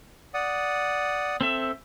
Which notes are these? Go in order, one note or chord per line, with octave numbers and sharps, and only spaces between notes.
D5 F#5 D#6
C4 A4 E5